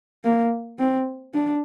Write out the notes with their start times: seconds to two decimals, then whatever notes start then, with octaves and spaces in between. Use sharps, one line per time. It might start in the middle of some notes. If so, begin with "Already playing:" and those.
0.24 A#3
0.79 C4
1.34 D4